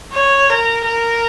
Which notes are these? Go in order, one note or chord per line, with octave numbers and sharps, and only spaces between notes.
C#5
A#4
A#4